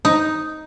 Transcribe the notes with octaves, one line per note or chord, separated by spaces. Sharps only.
D#4